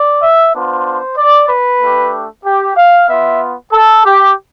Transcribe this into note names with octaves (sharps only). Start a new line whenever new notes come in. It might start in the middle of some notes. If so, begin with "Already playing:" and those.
Already playing: D5
E5
B3 D4 F4 C5
D5
B4
A3 D4 G4
G4
F5
B3 F4 E5
A4
G4